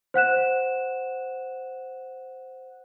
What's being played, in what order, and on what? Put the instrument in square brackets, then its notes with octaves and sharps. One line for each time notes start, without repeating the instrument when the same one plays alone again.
[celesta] C5 F#5 F#6 E7